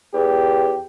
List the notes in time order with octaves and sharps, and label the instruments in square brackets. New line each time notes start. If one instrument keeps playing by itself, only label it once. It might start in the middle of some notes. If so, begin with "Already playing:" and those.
[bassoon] E2 [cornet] G4